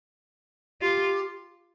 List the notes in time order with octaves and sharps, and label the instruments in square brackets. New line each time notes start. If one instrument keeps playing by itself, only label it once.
[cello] F4 [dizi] G4